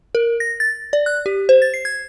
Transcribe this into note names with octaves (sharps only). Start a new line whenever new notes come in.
A#4
A#6
A6
D5
F#6
G4
C5
A6
C7
G#6